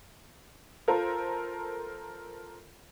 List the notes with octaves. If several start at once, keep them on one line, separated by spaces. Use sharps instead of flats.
F4 A4 A#4 C5